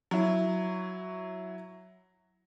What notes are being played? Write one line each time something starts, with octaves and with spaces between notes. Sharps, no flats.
F#3 E4